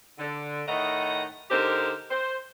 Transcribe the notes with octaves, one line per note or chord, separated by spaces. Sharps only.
D3
A2 D#3 A3 D#5 F#5 A#5
D3 D#4 G4 A#4 C5
C5